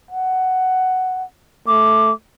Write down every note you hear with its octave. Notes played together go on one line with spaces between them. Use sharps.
F#5
A3 D6